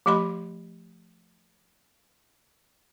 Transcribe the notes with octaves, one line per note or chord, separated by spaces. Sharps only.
F3 A3 G4 D#5 B5 C6